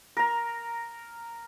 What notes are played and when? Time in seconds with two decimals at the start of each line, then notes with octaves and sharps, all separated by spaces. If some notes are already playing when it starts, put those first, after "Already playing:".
0.17 A#4 A#5